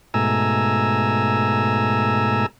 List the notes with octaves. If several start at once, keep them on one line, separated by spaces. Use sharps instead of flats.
G#2 B2 A3 G#5 A#5 E6